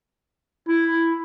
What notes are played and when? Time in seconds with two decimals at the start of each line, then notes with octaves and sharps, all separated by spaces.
0.68 E4